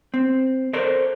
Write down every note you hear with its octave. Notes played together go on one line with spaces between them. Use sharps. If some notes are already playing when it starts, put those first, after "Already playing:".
C4
A4 A#4 C5 D5